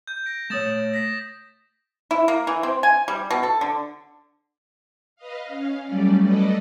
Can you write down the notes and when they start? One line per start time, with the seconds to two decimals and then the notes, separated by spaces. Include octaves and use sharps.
0.07 G6
0.26 A#6 D7
0.50 A3 C#5 D#6 A6 E7
0.93 A#6 B6
2.11 E4
2.28 A#3
2.47 E3
2.63 C4
2.83 G#5
3.08 G3
3.31 B2
3.43 A4
3.61 D3
5.16 B4 D#5 F5
5.46 C#4 F5
5.84 F#3 G3 A3 C#4 D5
6.21 A4 B4 D5 D#5